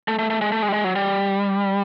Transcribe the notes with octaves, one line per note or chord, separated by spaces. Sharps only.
A3
A3
A3
G#3
A3
G#3
G3
G#3
F#3
G3